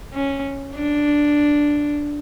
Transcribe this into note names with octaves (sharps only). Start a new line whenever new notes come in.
C#4
D4